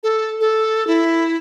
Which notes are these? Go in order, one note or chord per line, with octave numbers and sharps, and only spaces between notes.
A4
A4
E4